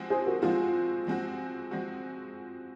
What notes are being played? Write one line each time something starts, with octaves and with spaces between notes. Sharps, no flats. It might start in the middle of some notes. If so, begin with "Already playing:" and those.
Already playing: F3 G#3 C4 F#4
G#4 C5
F#4 A#4
F3 G#3 C4 F4 F#4 G#4
F3 G#3 C4 F#4
F3 G#3 C4 F#4